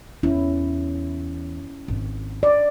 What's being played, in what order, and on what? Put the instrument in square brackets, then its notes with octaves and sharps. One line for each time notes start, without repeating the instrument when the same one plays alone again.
[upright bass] E2 [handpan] C#4 E4
[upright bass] G#1
[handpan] D5